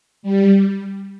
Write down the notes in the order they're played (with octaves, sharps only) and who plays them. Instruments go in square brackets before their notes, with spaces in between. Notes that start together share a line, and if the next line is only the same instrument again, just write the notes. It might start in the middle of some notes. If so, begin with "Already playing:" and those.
[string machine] G3